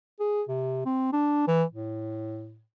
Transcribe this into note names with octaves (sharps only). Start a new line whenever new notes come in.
G#4
C3
C4
D4
E3
A2